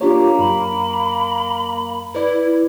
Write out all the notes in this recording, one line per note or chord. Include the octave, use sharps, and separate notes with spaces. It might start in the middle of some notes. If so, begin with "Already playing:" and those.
A#3 D4 F4 G4 C#5
F#2 B5
E4 B4 D5